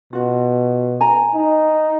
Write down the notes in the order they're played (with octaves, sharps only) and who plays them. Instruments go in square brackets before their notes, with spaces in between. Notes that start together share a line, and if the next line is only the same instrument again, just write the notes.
[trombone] B2 [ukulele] F4 F#4
[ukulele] G#5 A#5
[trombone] D#4